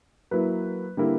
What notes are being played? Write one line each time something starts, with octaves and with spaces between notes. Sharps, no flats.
F#3 A#3 E4 B4
D3 G3 A#3 E4